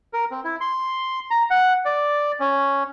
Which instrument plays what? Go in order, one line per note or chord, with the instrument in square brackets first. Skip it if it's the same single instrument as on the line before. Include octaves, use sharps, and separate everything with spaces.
[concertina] A#4
C4
E4
C6
A#5
F#5
D5
C#4